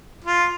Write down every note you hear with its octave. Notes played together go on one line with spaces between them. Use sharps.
F4